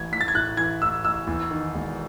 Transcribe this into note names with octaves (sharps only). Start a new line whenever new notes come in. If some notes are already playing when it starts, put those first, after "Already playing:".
Already playing: A1 A2 E3 G#6
A1 B6
A6
G#6
A2 F#6
E3 G#6
A1 E6
A1 E6
E2
D#3
E1